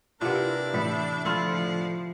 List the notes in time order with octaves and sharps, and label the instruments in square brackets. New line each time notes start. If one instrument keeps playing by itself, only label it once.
[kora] C3 F#5 [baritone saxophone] D4 [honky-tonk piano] E4 F4 G4 [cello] A#4 B4
[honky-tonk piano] A2 E5 B5 [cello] E3 [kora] A4
[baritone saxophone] D3 [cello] F3 [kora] E4 F4